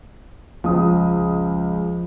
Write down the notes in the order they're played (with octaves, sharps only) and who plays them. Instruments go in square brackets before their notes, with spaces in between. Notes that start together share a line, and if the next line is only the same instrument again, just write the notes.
[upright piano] C#2 D#6 [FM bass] F3